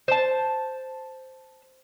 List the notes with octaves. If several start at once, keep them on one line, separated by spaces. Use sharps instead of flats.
C5 A5